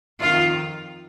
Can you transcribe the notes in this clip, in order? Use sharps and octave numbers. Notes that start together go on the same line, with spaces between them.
F2 D#3 F4